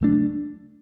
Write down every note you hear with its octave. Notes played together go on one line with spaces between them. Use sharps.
C#3 F#3 A3 D4